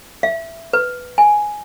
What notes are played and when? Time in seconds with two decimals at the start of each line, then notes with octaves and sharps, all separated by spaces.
0.23 E5
0.73 B4
1.18 G#5